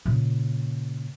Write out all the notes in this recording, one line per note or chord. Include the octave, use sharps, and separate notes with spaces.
A#2 C#3